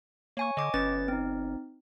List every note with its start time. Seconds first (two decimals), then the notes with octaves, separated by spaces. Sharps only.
0.37 A#3 C#5 G#5 C#6
0.57 D3 D#5 D6
0.74 G1 C#4 B4 A6
1.08 C4 D#4